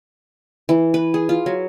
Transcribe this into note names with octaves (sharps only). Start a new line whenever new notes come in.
E3
B4
G#4
F4
F#3